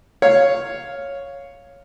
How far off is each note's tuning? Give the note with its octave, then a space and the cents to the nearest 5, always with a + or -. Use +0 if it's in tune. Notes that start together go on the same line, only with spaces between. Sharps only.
C#5 +0 F5 +0